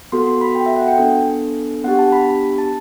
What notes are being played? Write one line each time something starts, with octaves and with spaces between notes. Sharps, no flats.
B3 F#4 A4 C6
C6
B5
G5
E5
F#5
G5
B3 D4 A4
B3 D4 G4 F#5
A5
B5
A5